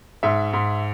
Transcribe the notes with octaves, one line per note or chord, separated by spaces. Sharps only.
G#2 E5
G#2